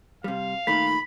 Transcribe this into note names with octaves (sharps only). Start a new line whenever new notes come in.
C3 G3 F5
A#2 D#3 A3 B5 B6